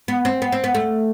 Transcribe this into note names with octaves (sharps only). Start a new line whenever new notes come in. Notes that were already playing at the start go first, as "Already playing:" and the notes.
B3
C4
B3
C4
B3
A3